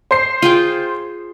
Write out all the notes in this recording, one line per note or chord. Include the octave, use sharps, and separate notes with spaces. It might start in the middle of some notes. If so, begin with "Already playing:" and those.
C5 C7
F4 G#4 G5